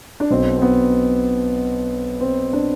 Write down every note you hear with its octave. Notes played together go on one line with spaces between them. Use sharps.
D4
B1 B2 C4
C4
B3
C4
D4